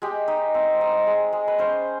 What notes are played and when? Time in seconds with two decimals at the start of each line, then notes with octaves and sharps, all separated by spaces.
0.02 G#3 G4
0.28 D#4
0.54 C4
0.81 D#4
1.07 G#3
1.33 G#3
1.48 B4
1.58 C#4 C5